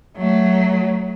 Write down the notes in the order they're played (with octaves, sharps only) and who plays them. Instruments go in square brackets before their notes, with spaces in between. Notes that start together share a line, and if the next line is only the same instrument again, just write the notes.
[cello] F#3 A3